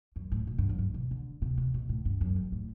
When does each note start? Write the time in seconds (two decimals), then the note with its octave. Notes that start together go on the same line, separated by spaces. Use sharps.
0.16 F#2
0.32 A2
0.47 B2
0.58 G2
0.69 F#2
0.79 G2
0.94 B2
1.11 D3
1.42 C3
1.58 C3
1.74 B2
1.89 A2
2.05 G2
2.21 F#2
2.36 G2
2.52 A2